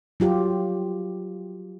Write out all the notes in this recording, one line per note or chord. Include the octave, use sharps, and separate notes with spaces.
F#3 F4 G4